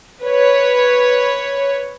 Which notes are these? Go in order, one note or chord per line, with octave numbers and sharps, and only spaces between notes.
B4 C#5